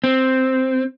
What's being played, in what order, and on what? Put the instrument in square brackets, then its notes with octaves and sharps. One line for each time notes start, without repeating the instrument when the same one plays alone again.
[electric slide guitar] C4